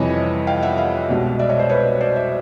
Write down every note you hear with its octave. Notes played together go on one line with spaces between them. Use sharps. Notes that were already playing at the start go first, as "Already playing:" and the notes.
Already playing: F2 C3 E3 G3 C#5 D#5
F5 G5
E5 F#5
D#5 F5
C2 B2 G#3
D5 E5
C#5 D#5
C5 D5
B4 C#5
C5 D5
D5 E5